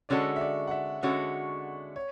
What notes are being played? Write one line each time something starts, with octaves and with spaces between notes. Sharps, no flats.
D3 G#3 C#4 F#4 A4 D5
E5
D5
F#5
E5
D3 G#3 C#4 F#4 A4
C#5